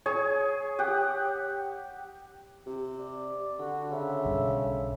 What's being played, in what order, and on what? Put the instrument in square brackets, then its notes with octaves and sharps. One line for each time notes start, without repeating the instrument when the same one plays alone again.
[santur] G#4 [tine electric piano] C#5
[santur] G4 F#5
[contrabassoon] C3
[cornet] D5
[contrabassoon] D3 [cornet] F#4
[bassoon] C#3 [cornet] E5
[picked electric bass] B1 G2